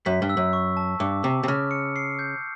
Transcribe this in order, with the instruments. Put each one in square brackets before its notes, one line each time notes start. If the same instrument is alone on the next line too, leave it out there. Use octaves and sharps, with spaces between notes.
[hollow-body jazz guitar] F#2 [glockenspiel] B6
[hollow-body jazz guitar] G2
[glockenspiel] E6
[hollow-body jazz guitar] F#2
[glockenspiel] C#6
A5
[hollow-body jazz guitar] G2 [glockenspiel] D6
[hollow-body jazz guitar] C3 [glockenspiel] D6
[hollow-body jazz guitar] C3
[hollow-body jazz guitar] C#3 [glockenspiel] F6
[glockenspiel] C#7
C7
G6